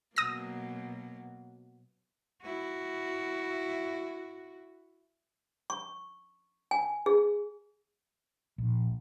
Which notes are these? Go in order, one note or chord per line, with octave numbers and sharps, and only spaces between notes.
B2 F#3 A#3 D#6 A#6
E4 F#4
C#6
G#5
G#4
A#1